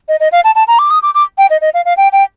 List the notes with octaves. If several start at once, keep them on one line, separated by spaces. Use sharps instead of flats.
D#5
D#5
F5
A5
A5
A#5
D6
D#6
D6
D6
G5
D#5
D#5
F5
F5
G5
G5